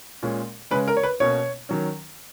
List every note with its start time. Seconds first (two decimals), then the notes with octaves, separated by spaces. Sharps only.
0.23 A#2 G#3 C#4
0.71 C#3 G#3 C#4 B4
0.88 A#4
0.97 C#5
1.03 B4
1.20 B2 A#3 C#4 C#5
1.69 D#3 F#3 C#4